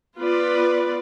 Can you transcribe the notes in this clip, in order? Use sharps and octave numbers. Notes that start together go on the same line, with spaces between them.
B3 F4 B4 D5